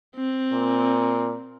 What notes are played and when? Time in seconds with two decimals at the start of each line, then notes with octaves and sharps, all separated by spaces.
0.16 C4
0.52 A#2